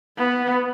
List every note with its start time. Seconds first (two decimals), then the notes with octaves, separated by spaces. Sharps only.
0.18 B3